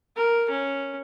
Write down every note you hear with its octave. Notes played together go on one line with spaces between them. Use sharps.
A#4
C#4